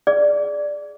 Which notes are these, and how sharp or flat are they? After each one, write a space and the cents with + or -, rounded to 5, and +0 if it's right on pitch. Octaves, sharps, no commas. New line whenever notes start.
G#4 +0 D5 +0